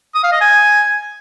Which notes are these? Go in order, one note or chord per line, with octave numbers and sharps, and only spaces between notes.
D#6
F5
D#5
G#5